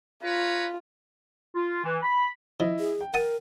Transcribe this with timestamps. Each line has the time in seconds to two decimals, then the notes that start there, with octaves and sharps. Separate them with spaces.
0.23 F4 B4 C#5 A#5
1.55 F4
1.84 E3
2.03 B5
2.60 F3 E4 D#5
2.79 G#4
3.01 G5
3.14 A#4 F#5 A5 D#6